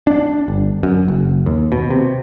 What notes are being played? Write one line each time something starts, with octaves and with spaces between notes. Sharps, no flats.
D4
G1
F#2
F#1
D#2
B2
C3